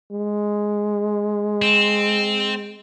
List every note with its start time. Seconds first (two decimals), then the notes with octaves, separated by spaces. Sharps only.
0.12 G#3
1.62 C4